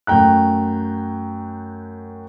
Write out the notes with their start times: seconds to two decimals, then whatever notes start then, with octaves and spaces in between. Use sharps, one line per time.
0.07 F#2 A3 G5 A#5 F#6